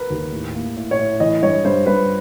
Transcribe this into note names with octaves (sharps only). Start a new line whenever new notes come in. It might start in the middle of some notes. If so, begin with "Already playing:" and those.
Already playing: A#4 B4
D#2
A2
A#3
A2
C#5
A2
E3 D#5
G2 C#5
G2 C5
G2 B4